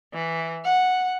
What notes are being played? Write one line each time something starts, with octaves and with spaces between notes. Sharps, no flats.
E3
F#5